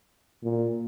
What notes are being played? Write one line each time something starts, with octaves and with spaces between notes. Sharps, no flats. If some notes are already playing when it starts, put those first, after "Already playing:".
A#2